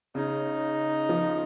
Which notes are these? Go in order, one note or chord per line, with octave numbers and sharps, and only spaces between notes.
C#3 D#4
F3